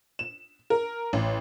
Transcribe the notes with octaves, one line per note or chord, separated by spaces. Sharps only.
E7
A#4
A1